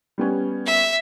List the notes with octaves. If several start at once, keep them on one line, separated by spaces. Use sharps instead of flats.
G3 B3 C#4
E5